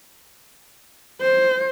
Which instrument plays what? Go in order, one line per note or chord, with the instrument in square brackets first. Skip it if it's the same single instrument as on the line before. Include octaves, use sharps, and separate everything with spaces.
[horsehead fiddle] C5